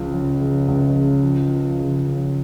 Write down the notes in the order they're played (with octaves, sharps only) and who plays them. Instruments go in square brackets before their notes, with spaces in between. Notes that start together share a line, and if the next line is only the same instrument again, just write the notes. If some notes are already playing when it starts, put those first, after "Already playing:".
Already playing: [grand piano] C#2 F3
C#3
C#3
C#2
C#3
F3
F3
C#3
C#3